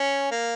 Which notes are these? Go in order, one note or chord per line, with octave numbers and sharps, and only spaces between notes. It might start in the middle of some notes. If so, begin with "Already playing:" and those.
Already playing: C#4
A#3